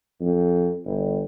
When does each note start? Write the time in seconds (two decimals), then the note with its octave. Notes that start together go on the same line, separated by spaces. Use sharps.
0.21 F2
0.85 G1